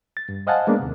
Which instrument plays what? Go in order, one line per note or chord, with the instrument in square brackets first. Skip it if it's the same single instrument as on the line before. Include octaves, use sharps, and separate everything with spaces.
[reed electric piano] A6
G2
C5 D#5 F5 F#5 G#5 A5
G#3 A#3 B3 D4
D#2 C3